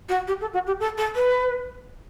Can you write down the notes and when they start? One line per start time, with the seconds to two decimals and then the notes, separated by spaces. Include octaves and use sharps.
0.09 F#4
0.27 G4
0.41 A4
0.53 F#4
0.66 G4
0.80 A4
0.97 A4
1.15 B4